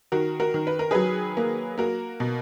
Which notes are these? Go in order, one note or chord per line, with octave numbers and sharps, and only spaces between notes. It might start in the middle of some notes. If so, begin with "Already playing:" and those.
D#3 F#4 A#4
F#4 A#4
D#3
B4
A#4
F#3 G#4 B4
A#3
A#3 F#4 A#4
B2